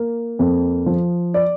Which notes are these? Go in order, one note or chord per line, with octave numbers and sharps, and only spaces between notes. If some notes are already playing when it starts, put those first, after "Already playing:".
Already playing: A#3
F2
F3
D5